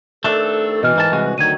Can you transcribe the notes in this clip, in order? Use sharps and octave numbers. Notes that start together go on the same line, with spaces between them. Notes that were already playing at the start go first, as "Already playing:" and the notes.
C2 D#3 A3 D4 A4 E7
B2 E3 D#5 F6
G#2 A#3 A5
C2 G#3 F#4
D2 D#3 F#3 G#6 D#7